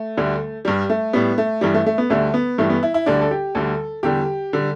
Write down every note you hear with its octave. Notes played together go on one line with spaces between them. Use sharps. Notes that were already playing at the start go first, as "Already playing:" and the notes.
Already playing: A3
D2 D3 G3
G2 G3
A3
A2 G3 B3
A3
G2 E3 G3
A3
A3
B3
D2 D3 G3 A3
B3
G2 E3 G3 A3
B3
E4
E4
D2 D3 G3 D4
A4
G4
D2 D3 G3 A4
E2 D3 G3 G4
D3 G3